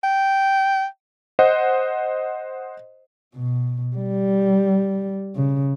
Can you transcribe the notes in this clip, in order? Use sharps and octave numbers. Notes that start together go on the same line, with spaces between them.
G5
C5 D#5 F#5
B2
G3
C#3